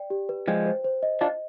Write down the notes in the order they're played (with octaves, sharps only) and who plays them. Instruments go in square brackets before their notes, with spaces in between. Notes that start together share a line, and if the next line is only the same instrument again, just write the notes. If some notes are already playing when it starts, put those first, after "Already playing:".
Already playing: [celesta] D5 G5
G4
B4
[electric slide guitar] F3 G#3 [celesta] G5
[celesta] C5
C5
D#5
[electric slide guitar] D4 F4 [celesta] D#5